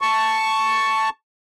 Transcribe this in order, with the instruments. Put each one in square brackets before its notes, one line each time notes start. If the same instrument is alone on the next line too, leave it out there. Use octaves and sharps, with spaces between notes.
[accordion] A5 C#6